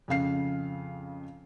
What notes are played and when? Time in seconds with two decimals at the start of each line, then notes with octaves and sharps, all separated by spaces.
0.08 F2 C#3 F5 C7